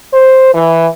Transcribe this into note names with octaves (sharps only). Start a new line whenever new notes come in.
C5
E3